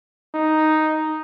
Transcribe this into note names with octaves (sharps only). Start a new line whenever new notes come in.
D#4